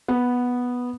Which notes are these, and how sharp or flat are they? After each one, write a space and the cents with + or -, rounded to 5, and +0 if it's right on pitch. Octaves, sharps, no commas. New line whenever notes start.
B3 -5